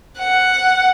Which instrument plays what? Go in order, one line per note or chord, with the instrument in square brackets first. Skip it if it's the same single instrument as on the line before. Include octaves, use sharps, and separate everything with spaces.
[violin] F#5